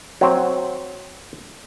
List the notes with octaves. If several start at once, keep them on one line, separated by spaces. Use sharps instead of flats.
F#3 C4